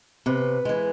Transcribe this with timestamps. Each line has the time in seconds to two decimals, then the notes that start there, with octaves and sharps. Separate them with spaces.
0.26 C3 B4
0.65 E3 G#3